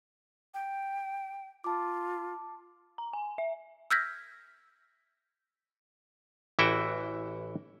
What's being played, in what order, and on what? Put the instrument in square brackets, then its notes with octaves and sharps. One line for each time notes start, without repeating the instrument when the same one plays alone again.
[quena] G5
[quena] F4 [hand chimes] A5 D6
[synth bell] A#5
G#5
E5
[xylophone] E6 F6 G6 G#6 A#6 B6
[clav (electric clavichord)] A1 E3 E4 F#4 E5 G5